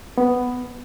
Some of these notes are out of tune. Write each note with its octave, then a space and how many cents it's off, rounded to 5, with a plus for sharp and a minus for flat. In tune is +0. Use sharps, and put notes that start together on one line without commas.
B3 +5